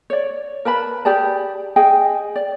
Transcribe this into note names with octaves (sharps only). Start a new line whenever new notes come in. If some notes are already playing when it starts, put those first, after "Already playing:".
C#5 D5
A#4 B4 A5 B5
G4 G#4 D5 A5
G#4 D#5 G5 G#5
D5